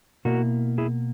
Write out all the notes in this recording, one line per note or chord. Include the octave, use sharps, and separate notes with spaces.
B2 A#3 E4 F#4 A#4
E4 G#4